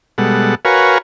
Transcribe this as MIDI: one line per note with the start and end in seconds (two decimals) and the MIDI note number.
0.18 0.55 47
0.18 0.55 55
0.18 0.55 56
0.18 0.55 69
0.18 0.55 78
0.65 0.98 66
0.65 0.98 70
0.65 0.98 71
0.65 0.98 73
0.65 0.98 77
0.65 0.98 80